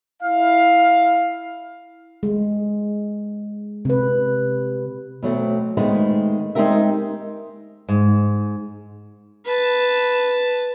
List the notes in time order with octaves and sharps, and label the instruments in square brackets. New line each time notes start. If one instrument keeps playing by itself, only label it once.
[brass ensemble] E4 F5
[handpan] G#3
C3 B4
[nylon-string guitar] B2 F#3 A3 C4
D#3 G#3 A3 B3 C4
G#3 C4 D#4 G4 A#4 E5
G#2
[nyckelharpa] B4 A5